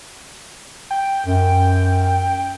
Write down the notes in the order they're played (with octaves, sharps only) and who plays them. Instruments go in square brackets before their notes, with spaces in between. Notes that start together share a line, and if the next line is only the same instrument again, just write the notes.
[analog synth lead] G5
[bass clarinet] F#2